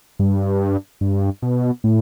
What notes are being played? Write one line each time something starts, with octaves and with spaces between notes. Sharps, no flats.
G2
G2
B2
A2